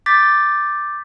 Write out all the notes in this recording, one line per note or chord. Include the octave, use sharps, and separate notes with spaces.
D6 G6 A6 B6